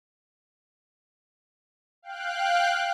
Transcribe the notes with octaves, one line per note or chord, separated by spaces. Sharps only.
F5 G5 F#6